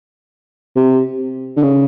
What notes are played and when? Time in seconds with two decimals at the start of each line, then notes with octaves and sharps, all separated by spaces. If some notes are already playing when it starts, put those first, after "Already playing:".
0.76 C3
1.57 D3
1.63 C#3